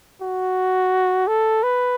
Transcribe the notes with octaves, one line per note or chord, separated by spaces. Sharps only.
F#4
A4
B4